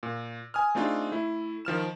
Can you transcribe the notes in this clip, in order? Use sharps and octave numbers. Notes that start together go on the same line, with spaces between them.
A#2
G#5 D#6 F6
A3 C4 D4 D#4 F4 G#4
A3 E4
D#3 F3 F6 E7